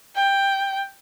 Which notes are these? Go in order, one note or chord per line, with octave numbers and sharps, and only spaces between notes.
G5